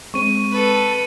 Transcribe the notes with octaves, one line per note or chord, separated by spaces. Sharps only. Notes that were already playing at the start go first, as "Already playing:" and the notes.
G#3 C4 C#6 D#7
A4 B4